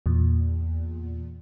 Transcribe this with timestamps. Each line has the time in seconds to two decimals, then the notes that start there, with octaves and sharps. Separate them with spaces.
0.06 E2 A#2